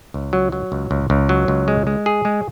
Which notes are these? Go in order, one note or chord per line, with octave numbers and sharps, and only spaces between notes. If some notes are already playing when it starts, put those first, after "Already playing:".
C#2
F#3
F#3
C#2
C#2
C#2
F#3
C#2
G#3
G#3
G#4
G#3